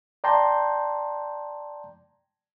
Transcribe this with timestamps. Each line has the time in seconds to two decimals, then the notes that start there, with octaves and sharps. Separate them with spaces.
0.24 D5 G5 A5 A#5 C6 G6